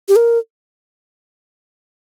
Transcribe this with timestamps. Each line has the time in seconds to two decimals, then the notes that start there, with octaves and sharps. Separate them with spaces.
0.08 G4
0.16 A#4